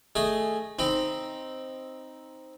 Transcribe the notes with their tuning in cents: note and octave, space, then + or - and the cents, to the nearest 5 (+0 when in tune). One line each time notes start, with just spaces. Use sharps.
A3 +0 G#4 +0 D#5 +0
C4 +0 D#4 +0 B5 +25